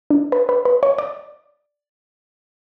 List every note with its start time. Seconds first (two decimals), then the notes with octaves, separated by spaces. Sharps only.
0.10 D4
0.32 B4
0.49 B4
0.65 B4
0.83 C#5
0.98 D5